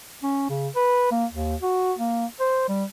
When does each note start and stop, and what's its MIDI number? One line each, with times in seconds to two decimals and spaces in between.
0.23 0.48 61
0.50 0.68 49
0.76 1.07 71
1.11 1.26 58
1.32 1.56 39
1.61 1.93 66
1.98 2.26 58
2.40 2.68 72
2.69 2.84 55